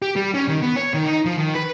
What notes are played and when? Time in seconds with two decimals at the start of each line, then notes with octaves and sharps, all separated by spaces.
0.02 G4
0.16 G3
0.34 C#4
0.48 D#3
0.62 B3
0.76 C#5
0.94 D#3
1.06 D#4
1.25 F3
1.38 D#3
1.55 B4